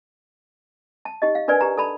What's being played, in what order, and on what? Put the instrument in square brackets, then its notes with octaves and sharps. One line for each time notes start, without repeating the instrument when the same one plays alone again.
[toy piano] A5
D#4 G4 D#5
F5
D4 A#4 B4 D5 G#5
G4 A#5
A4 D5 A5 B5